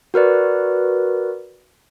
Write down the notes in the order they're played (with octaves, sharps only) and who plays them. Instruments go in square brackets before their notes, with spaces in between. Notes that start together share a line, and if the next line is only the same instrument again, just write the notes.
[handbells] F#4 A#4 B4 D5